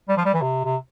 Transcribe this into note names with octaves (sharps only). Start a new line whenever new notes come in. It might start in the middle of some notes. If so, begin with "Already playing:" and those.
G3
F3
G3
E3
C3
C3